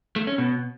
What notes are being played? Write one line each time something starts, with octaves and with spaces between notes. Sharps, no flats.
A3
C#4
B2